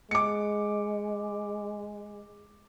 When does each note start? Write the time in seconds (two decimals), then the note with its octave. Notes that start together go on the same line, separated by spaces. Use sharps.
0.11 G#3 D6 C#7